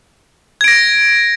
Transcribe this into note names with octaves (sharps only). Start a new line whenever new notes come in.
G#6 A#6 D7